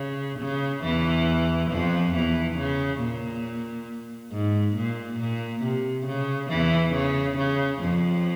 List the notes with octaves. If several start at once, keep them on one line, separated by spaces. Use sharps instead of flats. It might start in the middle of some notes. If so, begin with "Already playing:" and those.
Already playing: C#3
C#3
E2 E3
F2 F3
E2 E3
C#3
A#2
G#2
A#2
A#2
C3
C#3
E2 E3
C#3
C#3
F2 F3